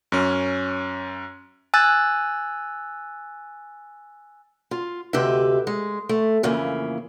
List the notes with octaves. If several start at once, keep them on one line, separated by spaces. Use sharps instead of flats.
F#2 C#4
G#5 E6 F#6 A6
F4
D2 C3 G4 B4 D#5 E5
G#3
A3
F2 C#3 E3 A#3